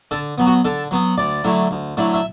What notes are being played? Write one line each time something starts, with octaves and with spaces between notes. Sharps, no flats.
D3 A4
F#3 B3
F#4
D3 A4
F#3 B3
D2 D5
D3 F#3 A3 E4
D2
D3 F#3 A3 E4
E5